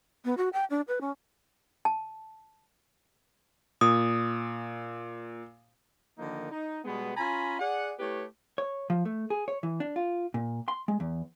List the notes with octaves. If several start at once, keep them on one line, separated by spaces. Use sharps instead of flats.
B3
F#4
G5
D4
B4
C#4
A5
A#2 D#6
D3 D#3 F3 A#3 D#4
D#4
B2 G3 G#3 B3
C#4 F4 G#5 A#5 B5
G#4 D5 F#5
A3 E4 G4 B4 C#5
C#5
F3
A3
G#4
C#5
E3
D4
F4
A#2
C6
G#3
E2